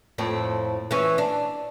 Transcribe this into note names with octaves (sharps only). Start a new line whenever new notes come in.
F2 A2 C4
E3 C#4
D4